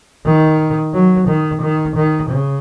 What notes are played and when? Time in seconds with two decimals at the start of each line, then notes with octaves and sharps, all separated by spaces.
0.25 D#3
0.93 F#3
1.27 D#3
1.61 D#3
1.96 D#3
2.30 C#3